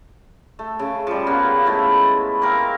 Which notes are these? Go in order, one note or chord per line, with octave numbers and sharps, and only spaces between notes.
A3
C#3
F3 G3
C#3 A#3 B3
G#3 A3 E4
A#3 C4 A#4 F5